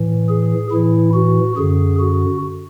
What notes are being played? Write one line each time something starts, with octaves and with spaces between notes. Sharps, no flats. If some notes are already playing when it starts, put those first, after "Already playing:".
Already playing: A2 E3
G#4
A2 E3 E4
F#4
F#2 D3 G#4
F#4